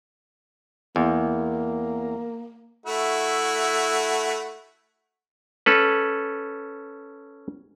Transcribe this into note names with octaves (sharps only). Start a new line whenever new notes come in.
E2 A#3
A3 E4 F#4
C#4 A4 B4